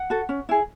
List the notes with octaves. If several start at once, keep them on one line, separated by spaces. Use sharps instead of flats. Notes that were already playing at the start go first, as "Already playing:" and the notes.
Already playing: F#5
F#4 A4
C#4
E4 G#4